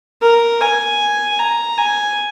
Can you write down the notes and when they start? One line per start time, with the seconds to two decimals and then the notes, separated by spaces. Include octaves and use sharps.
0.22 A#4
0.61 G#5
1.39 A#5
1.77 G#5